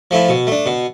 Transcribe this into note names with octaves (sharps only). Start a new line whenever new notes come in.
F3 A3 E4
B2
A3 D4
B2